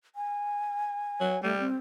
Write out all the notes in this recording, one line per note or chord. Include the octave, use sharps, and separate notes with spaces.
G#5
F#3
G3 A3
C4